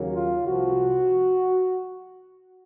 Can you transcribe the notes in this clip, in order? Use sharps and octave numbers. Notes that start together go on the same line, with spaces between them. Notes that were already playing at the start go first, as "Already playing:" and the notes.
Already playing: D#2 C#3 F#3 A#3
F4
C2 C3 F3 F#4